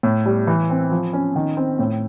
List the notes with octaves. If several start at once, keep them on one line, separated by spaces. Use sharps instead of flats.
A2
G3
E3
C4
F3
C#4
D#3
C4
A2